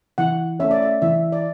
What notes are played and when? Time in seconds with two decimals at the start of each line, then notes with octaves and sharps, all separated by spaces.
0.18 E3 F#5
0.59 A3 C#4 E5
0.71 D5
0.82 E5
1.02 E3 E5
1.32 D5